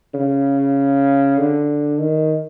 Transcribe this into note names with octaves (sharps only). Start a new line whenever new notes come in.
C#3
D3
D#3